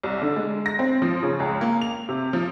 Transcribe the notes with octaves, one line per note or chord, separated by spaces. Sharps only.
C2
D3
G#3
A#6
C4
F3
C#3
C#2
A#3
F7
C3
F3